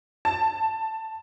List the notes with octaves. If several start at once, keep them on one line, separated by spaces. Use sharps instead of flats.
A5